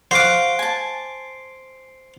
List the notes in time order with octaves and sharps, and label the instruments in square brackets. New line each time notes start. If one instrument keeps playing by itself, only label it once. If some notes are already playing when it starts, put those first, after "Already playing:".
[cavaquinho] F#4 F5 F#5 [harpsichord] C5 D6
[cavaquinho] G#5 A5